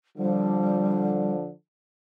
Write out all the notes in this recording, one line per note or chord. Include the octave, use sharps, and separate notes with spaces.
D3 F3 G3